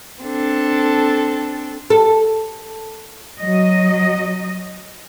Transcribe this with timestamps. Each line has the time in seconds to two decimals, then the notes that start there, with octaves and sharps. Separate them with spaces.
0.23 C4 D4 A4
1.90 A4
3.40 F#3 D#5